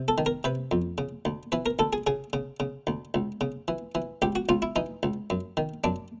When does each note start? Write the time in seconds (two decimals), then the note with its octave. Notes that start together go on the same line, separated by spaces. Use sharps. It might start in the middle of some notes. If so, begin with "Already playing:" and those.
Already playing: C3
0.08 A4
0.18 D#3
0.26 A#4
0.44 C3 B4
0.71 F2
0.98 C#3
1.25 D2
1.52 E3 B4
1.66 A#4
1.79 D2 A4
1.93 G#4
2.07 C#3 G#4
2.33 C#3
2.60 C#3
2.87 D2
3.14 C#2
3.41 C#3
3.68 E3
3.95 E3
4.22 C#2 G4
4.35 F#4
4.49 C#2 F4
4.62 E4
4.76 E3 D#4
5.03 C#2
5.30 F#2
5.57 D#3
5.84 F#2 D4